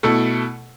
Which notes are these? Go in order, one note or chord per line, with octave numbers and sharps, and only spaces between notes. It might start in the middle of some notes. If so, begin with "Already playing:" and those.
B2 A3 E4 A4